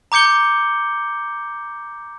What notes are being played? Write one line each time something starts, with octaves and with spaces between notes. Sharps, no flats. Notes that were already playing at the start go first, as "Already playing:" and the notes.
A#5 D6 G6 C#7 G7